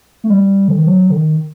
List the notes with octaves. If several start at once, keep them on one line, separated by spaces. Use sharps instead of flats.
A3
G3
D3
D#3
F#3
D3
D#3